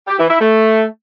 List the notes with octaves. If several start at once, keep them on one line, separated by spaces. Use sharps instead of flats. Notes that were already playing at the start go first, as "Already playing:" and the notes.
G4
E3
E4
A3